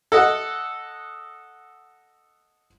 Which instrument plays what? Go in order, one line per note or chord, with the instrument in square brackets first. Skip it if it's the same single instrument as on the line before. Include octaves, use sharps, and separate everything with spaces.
[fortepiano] A4 D#5 F#5